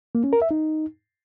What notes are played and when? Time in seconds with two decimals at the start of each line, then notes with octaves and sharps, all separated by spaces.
0.15 A#3
0.24 C#4
0.33 A#4
0.42 E5
0.51 D#4